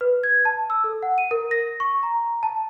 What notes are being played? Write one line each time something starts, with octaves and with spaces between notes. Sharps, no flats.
B4
G#6
A5
E6
A4
F#5
D#7
A#4
A#6
C#6
A#5
A5